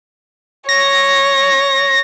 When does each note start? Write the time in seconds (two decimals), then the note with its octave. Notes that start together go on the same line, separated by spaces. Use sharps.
0.69 C#5 A#6